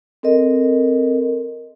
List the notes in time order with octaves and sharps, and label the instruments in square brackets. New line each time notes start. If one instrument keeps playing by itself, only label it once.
[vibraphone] C4 A4 A#4 D#5